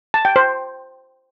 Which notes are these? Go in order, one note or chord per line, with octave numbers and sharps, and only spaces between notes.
A5
G5
C5